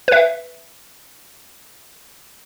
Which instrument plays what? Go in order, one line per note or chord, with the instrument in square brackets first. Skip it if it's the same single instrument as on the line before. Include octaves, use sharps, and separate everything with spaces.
[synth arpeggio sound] B4 E5